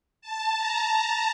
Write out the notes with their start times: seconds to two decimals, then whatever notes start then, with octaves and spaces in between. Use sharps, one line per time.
0.21 A5
0.57 A#5